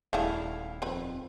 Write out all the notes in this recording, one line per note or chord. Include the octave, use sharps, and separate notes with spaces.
D#1 A3 D4 E4 G#4 F5
F2 C4 B4 B5